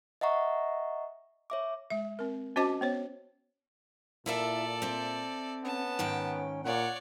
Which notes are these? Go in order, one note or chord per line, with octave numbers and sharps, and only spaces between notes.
D#5 E5 F#5 A#5 C#6
C#5 E5 D6
G#3 E5
C4 A#4
C#4 F#4 C5 D#5 A5 D6
B3 C5 C#5
A#2 E4 A4 A#4 D5 E5
C4 E5
B3 C#4 A5
G#2 D#3 G5
A#2 C#5 D5 F#5